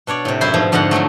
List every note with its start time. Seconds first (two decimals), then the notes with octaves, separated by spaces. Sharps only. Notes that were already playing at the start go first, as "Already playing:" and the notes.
0.07 B2 D4 C#5 D5
0.25 A2 C3
0.41 F#2 E4 F4 C5 C6
0.54 G#2 B2 F3
0.72 F2 G#2 D3 D#4 F4 F#5
0.91 F2 F3 F#3 A3